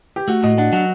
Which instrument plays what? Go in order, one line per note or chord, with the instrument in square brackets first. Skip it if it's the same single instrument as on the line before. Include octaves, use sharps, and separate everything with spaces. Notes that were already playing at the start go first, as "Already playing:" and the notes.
[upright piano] G4
[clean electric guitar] A3 [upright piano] F#4
[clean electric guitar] A2 [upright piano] D#5
[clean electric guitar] D4 [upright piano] F#5
[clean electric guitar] F#3 [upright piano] F#5